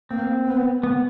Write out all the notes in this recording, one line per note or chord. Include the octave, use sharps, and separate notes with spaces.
A#3 C4
B3
B3